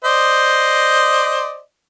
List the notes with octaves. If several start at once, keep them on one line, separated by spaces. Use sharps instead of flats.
C5 D5 D#5